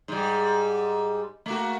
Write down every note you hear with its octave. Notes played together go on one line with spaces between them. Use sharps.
G#2 G3
A3 A#3 F#4